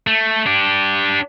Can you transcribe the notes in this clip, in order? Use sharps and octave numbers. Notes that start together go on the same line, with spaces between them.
A3
D4 G4